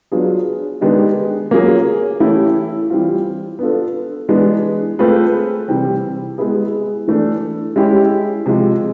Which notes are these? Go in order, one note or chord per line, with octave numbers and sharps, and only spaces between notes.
F#3 B3 D4 F4 G#4
D#3 G#3 B3 D4 G4
F#3 A#3 C#4 F4 G#4
E3 A3 C#4 E4 G4
E3 G3 C4 F4
B3 D4 F4 A4
E3 G#3 B3 D4
A3 C4 F4 G#4 B4
C3 E3 G3 C4
G#3 B3 E4 G#4 B4
E3 A3 D4
G#3 C#4 E4 G4
C3 F3 G#3